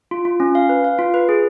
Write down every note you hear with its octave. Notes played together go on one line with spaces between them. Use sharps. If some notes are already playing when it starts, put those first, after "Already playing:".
F4
F4
C#4
F5
B4
F5
F4
B4
G#4